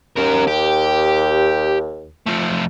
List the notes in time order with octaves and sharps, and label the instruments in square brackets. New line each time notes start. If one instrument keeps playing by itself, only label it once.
[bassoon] D#2 [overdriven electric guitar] C#4 A#4
[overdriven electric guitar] G4
F3 A3